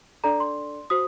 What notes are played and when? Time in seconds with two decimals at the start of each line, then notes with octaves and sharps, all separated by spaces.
0.24 D4 A4 D5 A#5
0.40 C6
0.90 F#4 C5 D#6